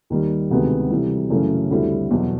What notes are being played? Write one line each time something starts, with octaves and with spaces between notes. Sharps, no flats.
D#2 D#3 G3
D2 C3 D#3 G#3 B3
C3 E3 G3
F#2 C#3 E3 A3 C#4
D2 D3 G3 C4 E4
E2 B2 F#3